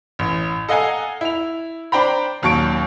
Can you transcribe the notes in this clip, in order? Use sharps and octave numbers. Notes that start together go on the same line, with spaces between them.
A1
A4 D#5 F5 F#5 G#5 A#5
E4 F7
D4 C5 G5 A#5 B5
D#1 D#2 F#3 A5 C#6 D7